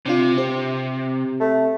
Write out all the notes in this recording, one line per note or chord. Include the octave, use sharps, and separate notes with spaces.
C3 C4 D4 F4
C4 G4
A3